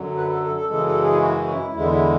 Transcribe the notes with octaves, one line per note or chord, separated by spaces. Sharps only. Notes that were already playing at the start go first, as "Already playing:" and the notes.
Already playing: F#2 D3 F#3
B4
A4
A4
A4
F#2 C#3 E3 G#3 A4
A4
G#4
E4
F#4
E4
E2 D3 G#3 E4
E4